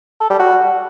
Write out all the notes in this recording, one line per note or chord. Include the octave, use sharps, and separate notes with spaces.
A4
G3
F#4